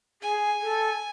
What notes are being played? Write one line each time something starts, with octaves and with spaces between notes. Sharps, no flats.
G#4 G#5
A4